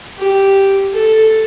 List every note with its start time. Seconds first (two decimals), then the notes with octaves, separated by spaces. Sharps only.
0.18 G4
0.93 A4